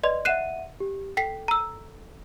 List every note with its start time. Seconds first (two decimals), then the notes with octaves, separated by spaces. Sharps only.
0.04 B4 D5 D#5 C6
0.25 E5 F#5 F#6 C7 D#7 E7
0.80 G4
1.17 A4 G5 B6 C7
1.48 A#5 E6